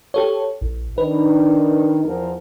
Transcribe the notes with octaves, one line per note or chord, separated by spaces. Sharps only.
G4 A4 C#5
A#1
D#3 D4 D#4 B4
E2 F3 A#4